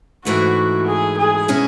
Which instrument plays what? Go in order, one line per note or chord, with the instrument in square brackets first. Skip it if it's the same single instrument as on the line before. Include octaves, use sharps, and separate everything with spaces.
[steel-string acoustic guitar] G#2 E3 A3 E4 [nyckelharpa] F#4
[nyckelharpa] G#4
G#4
[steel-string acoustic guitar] B2 G#3 C#4 E4 G#4